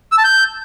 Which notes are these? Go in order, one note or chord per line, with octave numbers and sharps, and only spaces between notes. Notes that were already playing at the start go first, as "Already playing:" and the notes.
E6
A5
G6